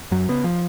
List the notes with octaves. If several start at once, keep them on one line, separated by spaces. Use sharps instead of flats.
F#2 F#3
C#3 B3
F3